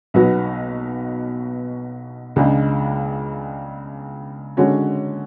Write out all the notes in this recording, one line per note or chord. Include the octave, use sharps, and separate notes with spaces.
B1 B2 F#3 B3 F#4
C#2 C#3 G#3 D4
D3 G#3 C#4 F#4 C#5